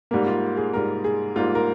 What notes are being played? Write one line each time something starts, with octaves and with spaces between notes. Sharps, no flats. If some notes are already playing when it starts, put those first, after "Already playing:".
G#2 G3 A#3
F4
G#4
G#2 G3 A#3 A#4
G#4
G#2 G3 A#3 F4
A#4